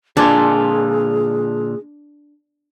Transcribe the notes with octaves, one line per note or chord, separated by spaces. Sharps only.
A#2 D3 D4 F4 G#4 A4 D5 G#5